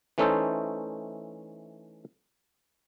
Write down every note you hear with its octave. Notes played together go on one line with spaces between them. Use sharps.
E3 A3 C#4 D#4 A4 C5